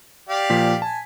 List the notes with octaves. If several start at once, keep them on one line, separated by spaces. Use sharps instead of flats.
G4 D5 F5
A#2 F3 B6
G#5 A5